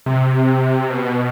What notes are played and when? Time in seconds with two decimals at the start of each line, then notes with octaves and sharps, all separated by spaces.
0.06 C3
0.90 B2